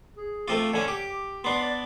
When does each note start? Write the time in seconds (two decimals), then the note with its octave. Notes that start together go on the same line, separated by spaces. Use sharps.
0.17 G#4
0.48 A3 C4 F4 D6
0.74 D3 C#4 G#5
0.88 G4 D6
1.44 B3 D4 C6
1.62 D5